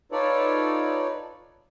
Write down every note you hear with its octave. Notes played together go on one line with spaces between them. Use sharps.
D#4 F4 A4 B4 C#5 D5